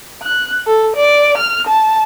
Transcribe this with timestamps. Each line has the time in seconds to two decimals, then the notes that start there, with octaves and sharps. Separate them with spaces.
0.22 F#6
0.67 A4
0.96 D5
1.37 F6
1.67 A5